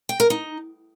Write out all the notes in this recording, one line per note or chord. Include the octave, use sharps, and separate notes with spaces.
G5
A#4
D#4